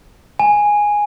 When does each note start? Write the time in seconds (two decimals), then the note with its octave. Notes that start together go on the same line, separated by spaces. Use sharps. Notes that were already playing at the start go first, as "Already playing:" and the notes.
0.39 G#5